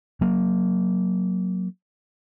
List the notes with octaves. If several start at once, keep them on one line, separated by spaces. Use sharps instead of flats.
F#3 A#3